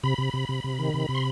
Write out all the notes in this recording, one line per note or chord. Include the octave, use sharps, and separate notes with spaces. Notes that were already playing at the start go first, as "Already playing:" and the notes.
C3 B5
C3
C3
C3
C3
D#3
C3
C3
C6